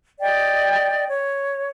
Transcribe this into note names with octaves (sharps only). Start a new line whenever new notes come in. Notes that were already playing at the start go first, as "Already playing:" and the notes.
D5 D#5 G5
C#5